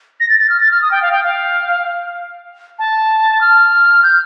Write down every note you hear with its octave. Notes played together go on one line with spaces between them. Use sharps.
A#6
A6
A6
F6
A6
F6
D#6
G5
F5
G5
F5
A5
F6
G6